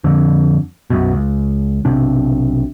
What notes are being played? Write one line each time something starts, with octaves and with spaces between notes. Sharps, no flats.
F2 D3
B1 F#2 B2
C#2
B1 C3 D4